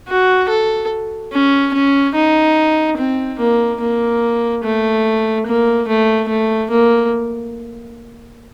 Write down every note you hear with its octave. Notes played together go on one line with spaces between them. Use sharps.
F#4
A4
C#4
C#4
D#4
C4
A#3
A#3
A3
A#3
A3
A3
A#3